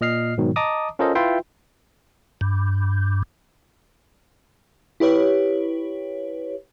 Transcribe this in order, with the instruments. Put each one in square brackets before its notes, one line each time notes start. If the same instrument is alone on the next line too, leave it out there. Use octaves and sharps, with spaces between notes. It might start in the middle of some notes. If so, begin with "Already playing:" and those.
[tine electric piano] A#2 D#5 F6 C7
G#2 B2 D#3 F#3
D#5 A5 A#5 D6 D#6
C#4 F4 A4 A#4 C5 D#5
E4 F4 B4 E5 G5 C6
[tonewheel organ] G2
[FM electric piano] E4 G4 B4 C#5